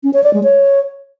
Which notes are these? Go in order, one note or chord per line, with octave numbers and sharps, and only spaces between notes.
C#4
C#5
D5
G#3
C#5